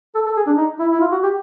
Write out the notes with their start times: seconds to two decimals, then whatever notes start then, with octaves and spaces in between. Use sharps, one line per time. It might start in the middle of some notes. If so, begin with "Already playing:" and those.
0.15 A4
0.26 A4
0.37 G#4
0.47 D4
0.57 D#4
0.79 E4
0.91 E4
1.01 F4
1.12 F#4
1.23 G4